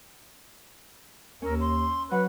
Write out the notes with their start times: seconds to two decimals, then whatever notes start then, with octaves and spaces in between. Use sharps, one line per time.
1.42 D#2 C#4 A#4 E6
1.61 C6
2.11 F#3 B4 F#5